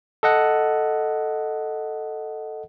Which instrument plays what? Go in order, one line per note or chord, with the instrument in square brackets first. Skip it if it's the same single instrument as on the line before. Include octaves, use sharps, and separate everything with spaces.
[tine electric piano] A4 D#5 F#5